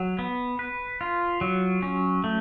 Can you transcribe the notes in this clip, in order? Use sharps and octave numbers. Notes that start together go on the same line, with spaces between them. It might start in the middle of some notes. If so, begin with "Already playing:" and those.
Already playing: F#3
B3
B4
F4
F#3
C#4
A3